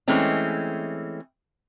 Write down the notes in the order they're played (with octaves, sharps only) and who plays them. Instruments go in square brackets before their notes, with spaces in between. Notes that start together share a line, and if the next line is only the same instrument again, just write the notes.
[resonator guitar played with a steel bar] E3 G#3 A3 C4 C#4